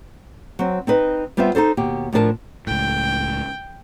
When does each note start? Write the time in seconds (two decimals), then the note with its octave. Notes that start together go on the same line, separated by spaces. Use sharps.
0.59 F#3 C4
0.87 C4 D#4 B4 D#5
1.37 G3 B3 C4 F4 C5 E5
1.55 D#4 F#4 A4 C5
1.77 D#2 B2 G4
2.13 A2 F3 D4 A4 A#4 A5
2.67 C#2 A2 G5